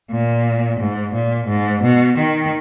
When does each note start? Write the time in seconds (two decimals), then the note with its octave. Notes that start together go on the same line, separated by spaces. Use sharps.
0.11 A#2
0.80 G#2
1.14 A#2
1.49 G#2
1.83 B2
2.18 D#3